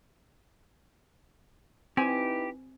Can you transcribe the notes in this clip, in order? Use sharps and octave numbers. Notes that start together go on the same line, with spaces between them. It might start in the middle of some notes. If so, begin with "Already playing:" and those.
C4 D#4 E4 G4 B4 G#5